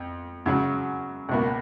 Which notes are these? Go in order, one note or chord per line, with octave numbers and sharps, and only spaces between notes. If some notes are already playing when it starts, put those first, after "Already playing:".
Already playing: F2
F#2 C#3 F#3
C#2 B2 A#3